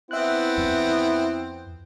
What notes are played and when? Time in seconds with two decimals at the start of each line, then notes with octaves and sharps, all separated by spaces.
0.11 B3 C4 E4 E5 F#6
0.58 F2